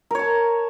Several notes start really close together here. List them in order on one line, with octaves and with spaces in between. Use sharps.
A#4 C#5 A5